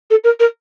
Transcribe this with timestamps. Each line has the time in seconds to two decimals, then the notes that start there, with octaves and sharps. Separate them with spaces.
0.10 A4
0.23 A#4
0.39 A#4